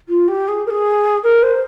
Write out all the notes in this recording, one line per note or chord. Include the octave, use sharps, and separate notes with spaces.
F4
G4
G#4
A#4
G#4
A#4
C5